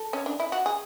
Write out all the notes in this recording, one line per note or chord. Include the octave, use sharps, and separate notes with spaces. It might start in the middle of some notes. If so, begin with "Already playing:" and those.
Already playing: A4
C#4
D4
E4
F#4
G#4